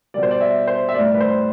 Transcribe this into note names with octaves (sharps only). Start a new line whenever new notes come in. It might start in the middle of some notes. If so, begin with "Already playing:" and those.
B2 G3 D5
C5
D5
E5
C5
E5
A2 G3 D5
B4
C5